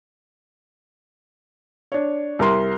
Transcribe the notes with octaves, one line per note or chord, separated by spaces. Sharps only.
D4 C#5
C2 A#4 C6